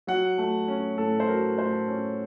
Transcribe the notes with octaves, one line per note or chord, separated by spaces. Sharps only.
F#3 F#5
A3
C#4
A2 A4
C5
F#3 A#4
A3 C5
C#4